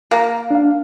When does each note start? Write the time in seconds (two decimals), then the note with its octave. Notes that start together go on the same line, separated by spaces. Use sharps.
0.11 A#3 F5 A#5
0.51 D4 F5